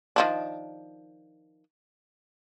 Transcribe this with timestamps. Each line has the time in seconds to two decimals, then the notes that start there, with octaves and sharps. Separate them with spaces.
0.16 D#3 F3 D4